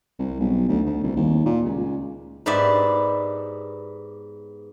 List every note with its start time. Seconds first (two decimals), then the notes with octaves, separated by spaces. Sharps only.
0.19 C2
0.40 B1
0.69 D2
0.86 D2
1.03 C2
1.16 D#2
1.46 A#2
1.66 C#2
2.46 G#2 B3 G4 D5 E5